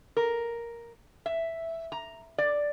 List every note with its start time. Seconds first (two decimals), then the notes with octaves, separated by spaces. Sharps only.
0.17 A#4
1.26 E5
1.92 A#5
2.38 D5